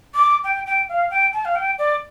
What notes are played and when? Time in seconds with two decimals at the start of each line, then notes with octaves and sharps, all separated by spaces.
0.14 D6
0.44 G5
0.66 G5
0.89 F5
1.11 G5
1.33 A5
1.45 F5
1.55 G5
1.79 D5